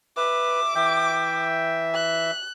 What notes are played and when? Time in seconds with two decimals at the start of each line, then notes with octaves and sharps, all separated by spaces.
0.17 B4 E5 D6
0.75 E3 E5 G5
1.95 F#6